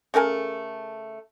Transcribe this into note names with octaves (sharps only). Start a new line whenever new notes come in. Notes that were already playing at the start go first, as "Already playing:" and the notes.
C#3 A3 A#4 G#5